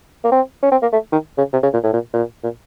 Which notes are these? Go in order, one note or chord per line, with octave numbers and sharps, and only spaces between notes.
A#3
C4
C#4
C4
A#3
A3
D#3
C#3
C3
C#3
A#2
A2
A#2
A#2
A#2